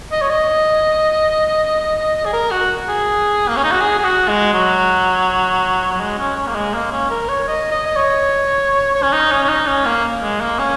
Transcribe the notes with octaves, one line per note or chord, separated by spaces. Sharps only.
D#5
C#5
D#5
G#4
A#4
F#4
G#4
A#3
C#4
D#4
F#4
G#4
G#4
F#4
G#3
F#3
F#3
G#3
C#4
C#4
A#3
G#3
A#3
C#4
A#4
C#5
D#5
D#5
D#5
C#5
C#5
C#4
D#4
C#4
C#4
D#4
C#4
A#3
G#3
A#3
C#4